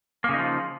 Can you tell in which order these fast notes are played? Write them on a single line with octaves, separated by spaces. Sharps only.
A#3 C#3 D#4 F3